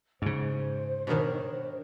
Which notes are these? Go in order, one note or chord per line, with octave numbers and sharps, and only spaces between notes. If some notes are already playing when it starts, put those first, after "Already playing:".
G#2 C#3 C5
B2 D#3 D4 A#4 C#5